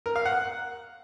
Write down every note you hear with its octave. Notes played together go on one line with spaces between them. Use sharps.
A#4
F5
F#5